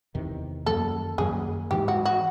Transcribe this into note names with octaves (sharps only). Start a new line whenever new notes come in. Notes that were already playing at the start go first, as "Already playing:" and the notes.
E2 C3 D#3
F#2 D#3 F#3 A#3 A4
F#2 D#3 F#3 A#3 G#4
G#2 E3 G#3 G4
F#4
F#4